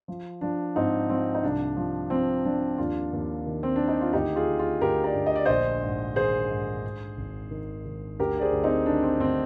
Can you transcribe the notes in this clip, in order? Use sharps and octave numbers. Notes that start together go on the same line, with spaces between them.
F3
F3 D4
G#2 C4 D#4
F3 C4
D#4
C2 D4
F3
F3 C4
F3 D4
D#2 D4 F4
D#2
D#3
C4
D#3 D4
D#4
F4
D2 D#4 G4
F4 G#4
D3
F4 G#4
D2 G4 A#4
A#4 D5
D2
D#5
D5
A#1 C5 D#5
G#2
D#3 G#4 C5
G#2
G#2
G#1
D#3
D#3
D2 G4 A#4
D5
G#4 C5
D2
C4 D#4
D#3 D4
C4
D2 C4